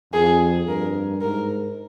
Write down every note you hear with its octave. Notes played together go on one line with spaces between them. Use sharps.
F2 G#4
G2 A#4
G#2 A#4